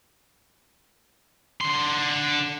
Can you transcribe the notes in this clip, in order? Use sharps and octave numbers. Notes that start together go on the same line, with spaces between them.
D3 C6